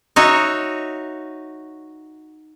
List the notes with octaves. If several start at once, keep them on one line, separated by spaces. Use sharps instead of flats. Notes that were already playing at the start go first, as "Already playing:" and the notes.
D#4 F#4 C#5 E5